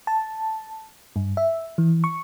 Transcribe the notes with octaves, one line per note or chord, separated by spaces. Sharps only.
A5
G2
E5
E3
C#6